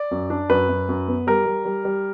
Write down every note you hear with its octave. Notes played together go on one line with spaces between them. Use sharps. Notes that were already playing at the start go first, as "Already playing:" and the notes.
Already playing: D5
F#2
D4
F#2 B4
F#2
F#2
B3
G3 A#4
G3
G3
G3